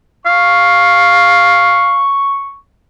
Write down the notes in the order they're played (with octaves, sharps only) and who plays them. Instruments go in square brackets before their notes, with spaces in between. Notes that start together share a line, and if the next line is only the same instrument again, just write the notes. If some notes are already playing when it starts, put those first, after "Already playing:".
[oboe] F5 [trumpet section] C#6